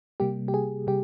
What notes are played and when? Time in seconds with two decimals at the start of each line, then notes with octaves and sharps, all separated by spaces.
0.20 C3 G3 A#3 G4
0.48 G4
0.54 G#4
0.87 C3 G3 G4